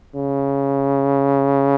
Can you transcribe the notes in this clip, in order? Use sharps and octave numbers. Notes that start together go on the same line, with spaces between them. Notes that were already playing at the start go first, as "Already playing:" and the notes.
C#3